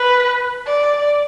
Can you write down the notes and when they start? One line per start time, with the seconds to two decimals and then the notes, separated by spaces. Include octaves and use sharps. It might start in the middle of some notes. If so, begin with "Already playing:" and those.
Already playing: B4
0.66 D5